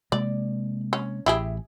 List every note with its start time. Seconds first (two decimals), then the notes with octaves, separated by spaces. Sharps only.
0.12 C3 G#3 A#3 D5
0.93 C#4
1.26 A1 E4 G4 G#4